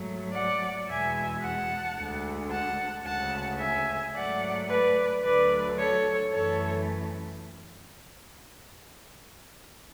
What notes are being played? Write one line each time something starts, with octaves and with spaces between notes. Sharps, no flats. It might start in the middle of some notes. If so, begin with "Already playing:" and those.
Already playing: G#2 F#3 A3
D5 F#5
E2 B2 G#3 E5 G#5
F#5 A5
D2 D3 G#3
F#5 A5
D2 C#3 G#3 F#5 A5
E5 G#5
G#2 F#3 A3 D5 F#5
B4 D5
D2 D3 F#3 A3 B4 D5
A4 C#5
F#2 E3 A3 A4 C#5